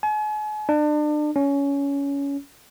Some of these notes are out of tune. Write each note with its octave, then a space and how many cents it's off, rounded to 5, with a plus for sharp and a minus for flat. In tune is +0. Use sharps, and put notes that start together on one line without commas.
G#5 +40
D4 +35
C#4 +20